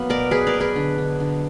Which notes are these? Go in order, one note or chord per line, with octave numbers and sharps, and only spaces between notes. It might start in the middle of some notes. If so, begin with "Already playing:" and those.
Already playing: F#3 A#3 B3
B2 A#4 D5
F#3 G#4 B4
A#4 D5
B2
G#4 B4
D3
D3
D3